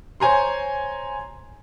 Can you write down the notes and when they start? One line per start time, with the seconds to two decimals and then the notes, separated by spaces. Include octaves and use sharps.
0.20 C5 C#5 G#5 A#5 C6